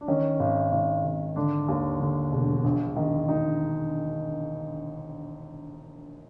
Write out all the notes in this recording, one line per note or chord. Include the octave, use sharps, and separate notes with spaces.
D4
D#3 C#4
G#1
G#1
G#1
D3 D4
D#2
D3
E1
A#1
D#3
D#3 D#4